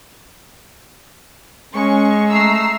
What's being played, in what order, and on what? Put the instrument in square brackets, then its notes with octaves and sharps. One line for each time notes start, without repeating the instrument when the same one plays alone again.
[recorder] G#3 [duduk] C#4 [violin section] C#6
[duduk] A3 [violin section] A#5 E6 C7